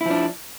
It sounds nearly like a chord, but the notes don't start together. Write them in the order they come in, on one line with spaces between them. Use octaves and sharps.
E4 F3 D4